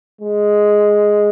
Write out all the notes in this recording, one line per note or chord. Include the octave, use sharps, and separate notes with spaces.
G#3